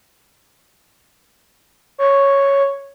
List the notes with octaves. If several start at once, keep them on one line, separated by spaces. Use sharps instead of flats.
C#5